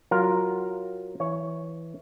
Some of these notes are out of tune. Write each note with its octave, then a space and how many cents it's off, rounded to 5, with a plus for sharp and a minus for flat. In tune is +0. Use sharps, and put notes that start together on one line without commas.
F#3 +0 F4 +0 A#4 +0
E3 +0 C#5 +5